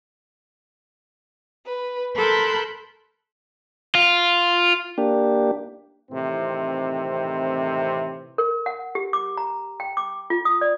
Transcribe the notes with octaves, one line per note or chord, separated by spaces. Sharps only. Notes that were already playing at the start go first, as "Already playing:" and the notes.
B4
A4 A#4 B5 C6 F#6 G6
F4
A#3 D4 G4
A2 C3 D#3 E3 C4
A#4
F#5
G4
D6
A#5
G5
D6
F4
D#6
D5